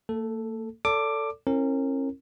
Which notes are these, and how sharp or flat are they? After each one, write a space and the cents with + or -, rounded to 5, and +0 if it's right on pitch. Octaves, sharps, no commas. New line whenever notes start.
A#3 -45 A4 +0
A4 +15 D5 -35 D6 +10
C#4 -40 E4 +0 A#4 -25